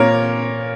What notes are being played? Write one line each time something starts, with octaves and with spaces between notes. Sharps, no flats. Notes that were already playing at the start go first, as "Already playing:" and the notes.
Already playing: A#2 A#3 A#4 C#5